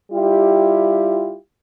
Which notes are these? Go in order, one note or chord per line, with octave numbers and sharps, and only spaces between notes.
G3 E4 F4 G4